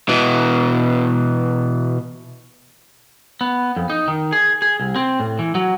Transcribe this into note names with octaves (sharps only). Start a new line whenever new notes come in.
B2 E3
B3
F2
D#4
D#3
G#4
G#4
C2
C4
A2
E3
F#3